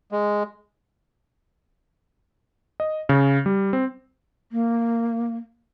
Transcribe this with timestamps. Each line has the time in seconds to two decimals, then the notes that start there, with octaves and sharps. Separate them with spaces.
0.12 G#3
2.80 D#5
3.09 C#3
3.46 G3
3.73 C4
4.52 A#3